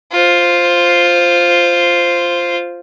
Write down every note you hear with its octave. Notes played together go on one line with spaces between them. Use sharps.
F4 C5